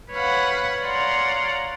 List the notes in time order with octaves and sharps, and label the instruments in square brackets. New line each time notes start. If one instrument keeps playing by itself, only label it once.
[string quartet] B4 C#5 F5 F#5 B5
C#5 D5 F5 F#5 A#5 C6